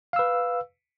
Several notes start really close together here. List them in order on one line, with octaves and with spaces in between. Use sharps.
F5 E6 B4